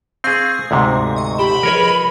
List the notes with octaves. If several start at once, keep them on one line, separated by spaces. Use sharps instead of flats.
C4 G#4 F5 C#6 D#6
D2 G#2 C3
D#5 C#6
G4 B5 E7
F3 G#4 A#4 B4 C#5 D#5